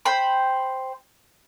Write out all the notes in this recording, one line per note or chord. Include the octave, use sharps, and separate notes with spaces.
C5 G5 B5